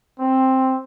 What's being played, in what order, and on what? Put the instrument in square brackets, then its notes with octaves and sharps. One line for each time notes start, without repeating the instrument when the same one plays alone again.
[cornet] C4